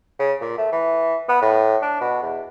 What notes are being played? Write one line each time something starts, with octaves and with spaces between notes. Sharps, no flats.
C#3
A#2
A3
E3
B3
A2
D4
B2
E2